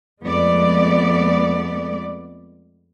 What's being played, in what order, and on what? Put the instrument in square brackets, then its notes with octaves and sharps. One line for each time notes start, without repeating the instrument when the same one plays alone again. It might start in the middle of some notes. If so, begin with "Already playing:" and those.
[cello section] F2 G#3 A3 B3 D5